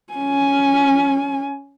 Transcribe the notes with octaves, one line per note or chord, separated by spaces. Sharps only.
C#4 G#5